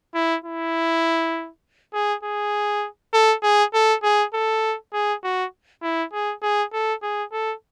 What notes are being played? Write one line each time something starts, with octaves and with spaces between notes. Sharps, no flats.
E4
E4
G#4
G#4
A4
G#4
A4
G#4
A4
G#4
F#4
E4
G#4
G#4
A4
G#4
A4